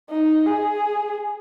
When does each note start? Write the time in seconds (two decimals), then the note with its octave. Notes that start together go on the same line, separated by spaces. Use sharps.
0.11 D#4
0.46 G#4